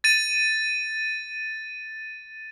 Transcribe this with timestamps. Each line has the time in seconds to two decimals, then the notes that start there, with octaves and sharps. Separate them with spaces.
0.04 A6 D#7